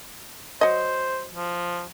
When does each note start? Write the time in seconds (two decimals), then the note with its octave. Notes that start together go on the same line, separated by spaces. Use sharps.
0.61 F#3 C5 D#5
1.32 F3